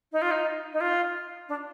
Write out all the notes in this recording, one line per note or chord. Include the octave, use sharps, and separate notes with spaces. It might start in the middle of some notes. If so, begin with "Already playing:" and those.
D#4
F4
D#4
D#4
F4
D4